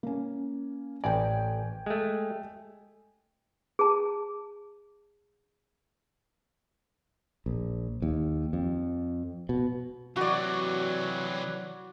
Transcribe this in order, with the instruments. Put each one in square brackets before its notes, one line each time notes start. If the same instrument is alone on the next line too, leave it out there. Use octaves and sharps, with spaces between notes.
[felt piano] A#3 C#4
[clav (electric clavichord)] A1 D5 [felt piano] G5 G#5
[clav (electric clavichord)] G#3 A3
[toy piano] G#4 A5
[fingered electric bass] A#1
D#2
F2
B2
[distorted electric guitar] C3 E3 [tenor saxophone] F#3 [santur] F#4 D5